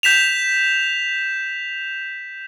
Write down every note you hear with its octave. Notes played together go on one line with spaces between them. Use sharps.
G6 B6 E7 F7